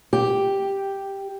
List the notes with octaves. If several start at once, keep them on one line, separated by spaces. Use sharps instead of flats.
G4